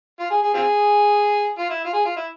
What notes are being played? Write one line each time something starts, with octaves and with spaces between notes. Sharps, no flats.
F4
G#4
G#4
C4 F4 G#4
F4
E4
F4
G#4
F4
E4